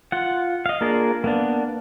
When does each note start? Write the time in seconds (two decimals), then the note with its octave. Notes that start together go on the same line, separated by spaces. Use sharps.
0.12 F4 F#5
0.66 D#5 F5
0.81 A#3 D4 F4 G#4 A#4
1.24 A#3 B3 D4